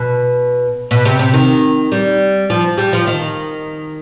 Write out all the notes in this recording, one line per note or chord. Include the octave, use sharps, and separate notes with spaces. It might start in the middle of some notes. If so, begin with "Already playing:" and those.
Already playing: B2
B2
C3
C3
D#3
G3
F3
G3
F3
D#3